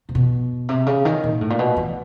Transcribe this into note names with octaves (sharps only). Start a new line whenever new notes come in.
C3
B2
C3
C#3
D#3
A#2
A2
A#2
B2
E3